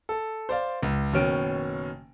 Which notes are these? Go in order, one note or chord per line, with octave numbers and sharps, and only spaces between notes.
A4
C5 D5 F5
C#2
F#1 B2 D#3 C#4 D7